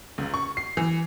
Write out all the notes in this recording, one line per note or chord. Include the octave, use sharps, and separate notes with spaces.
C#2
C#6
C7
E3